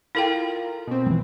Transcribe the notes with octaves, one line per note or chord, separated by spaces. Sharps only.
E4 F4 A4 A#4 G5
B2 C4
E3 G3